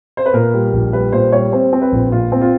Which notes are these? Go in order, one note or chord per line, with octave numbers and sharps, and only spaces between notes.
C5
B4
A#2 A#4
G3
A#1
G3 B4
A#2 C5
G3 C#5
C4 C5
C4
B4
A#1
A#2 F4
C4
F4